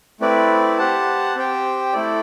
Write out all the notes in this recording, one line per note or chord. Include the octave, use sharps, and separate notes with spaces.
A3 C4 E4 B4 D5
G4 C5 F#5 A5
C4 G4 C5 G5
A3 E4 A4 D5